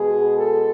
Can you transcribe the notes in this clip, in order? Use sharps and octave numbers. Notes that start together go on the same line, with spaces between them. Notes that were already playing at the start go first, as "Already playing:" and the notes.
Already playing: B2 G#3 G#4
A4